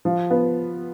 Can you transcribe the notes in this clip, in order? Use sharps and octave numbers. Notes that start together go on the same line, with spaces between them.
F3
B3